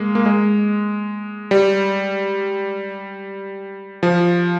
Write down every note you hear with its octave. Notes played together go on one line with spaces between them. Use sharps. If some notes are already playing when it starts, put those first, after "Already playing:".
Already playing: G#3 A#3
A#3
G#3
G3
F3